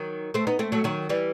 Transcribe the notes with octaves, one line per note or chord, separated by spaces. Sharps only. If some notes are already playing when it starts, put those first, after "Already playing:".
Already playing: D#3 F#3
A3 C4
B3 D#4
A3 C4
F#3 A3
D#3 F#3
E3 G3